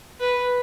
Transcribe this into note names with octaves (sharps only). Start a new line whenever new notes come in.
B4